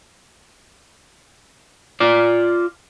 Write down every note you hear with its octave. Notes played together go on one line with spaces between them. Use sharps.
F4 D5